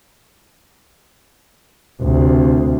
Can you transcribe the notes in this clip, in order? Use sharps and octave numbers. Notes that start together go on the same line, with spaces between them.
D2 C3